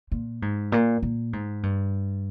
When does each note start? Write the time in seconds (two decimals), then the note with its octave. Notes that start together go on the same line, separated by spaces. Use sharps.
0.12 A#2
0.42 G#2
0.72 A#2
1.03 A#2
1.33 G#2
1.63 G2